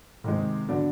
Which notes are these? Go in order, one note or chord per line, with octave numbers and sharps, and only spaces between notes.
C3 D#3 G#3 C4
D3 F#3 B3 D4